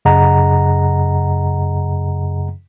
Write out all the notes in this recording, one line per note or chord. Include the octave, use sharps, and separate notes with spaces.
F#2 C#3 G#4 D#5 F#5 A#5